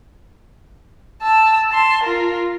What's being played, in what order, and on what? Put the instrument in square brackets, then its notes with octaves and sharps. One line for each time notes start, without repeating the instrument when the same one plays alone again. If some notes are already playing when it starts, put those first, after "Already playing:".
[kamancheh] A5 E6
A5 C6
F4 A#4